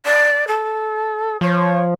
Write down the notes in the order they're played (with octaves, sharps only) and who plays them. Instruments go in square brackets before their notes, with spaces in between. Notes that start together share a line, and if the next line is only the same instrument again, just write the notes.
[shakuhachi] D5
A4
[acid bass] F3 [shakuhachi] C#5